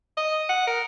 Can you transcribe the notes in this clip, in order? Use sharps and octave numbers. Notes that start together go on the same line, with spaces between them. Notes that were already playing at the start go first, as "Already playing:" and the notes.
D#5
F#5
A#4